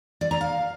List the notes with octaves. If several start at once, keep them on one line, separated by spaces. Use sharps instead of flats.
D5
A#5
F5